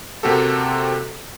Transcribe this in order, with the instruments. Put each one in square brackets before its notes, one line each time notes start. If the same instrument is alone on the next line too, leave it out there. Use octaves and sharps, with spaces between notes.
[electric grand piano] C3 A#3 C4 F#4 G4 A4